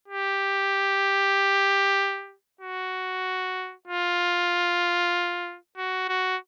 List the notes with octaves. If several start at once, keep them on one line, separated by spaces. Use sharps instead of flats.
G4
F#4
F4
F#4
F#4